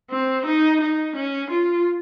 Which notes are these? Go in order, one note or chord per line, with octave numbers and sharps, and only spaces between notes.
C4
D#4
D#4
C#4
F4